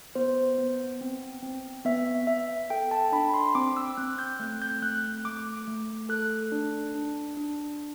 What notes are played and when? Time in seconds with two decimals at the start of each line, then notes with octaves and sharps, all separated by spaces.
0.15 B3 C5
0.59 B3
1.01 C4
1.43 C4
1.85 B3 E5
2.27 B3 E5
2.70 A4 G5
2.91 A5
3.12 D4 B5
3.34 C6
3.55 C4 D6
3.77 E6
3.97 C4 F#6
4.19 G6
4.40 A3 F#6
4.62 G6
4.82 A3 F#6
5.25 A3 D6
5.68 A3
6.09 A4 F#6
6.52 D4
6.95 D4
7.37 D4